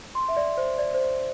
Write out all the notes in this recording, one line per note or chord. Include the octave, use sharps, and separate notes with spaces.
C6
E5
D5
C5
D5
C5